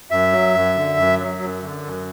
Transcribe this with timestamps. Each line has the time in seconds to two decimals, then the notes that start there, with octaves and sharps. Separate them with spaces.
0.11 F#2 E5
0.33 F#3
0.54 F#2
0.76 D3
0.97 F#2
1.19 F#3
1.41 F#2
1.63 D3
1.84 F#2